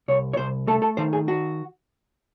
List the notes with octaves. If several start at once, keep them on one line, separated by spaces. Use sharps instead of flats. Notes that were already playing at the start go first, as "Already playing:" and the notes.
C2 C#5
C#5
C2 C5
A3 A4
A4
D#3 C5
G#4
F#4